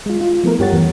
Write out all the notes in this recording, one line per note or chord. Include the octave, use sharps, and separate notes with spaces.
G#3 F4
F4
F3 A3 B3 E4 A4 A#4
G2 G4 C#5 F#5 A6
E2 E3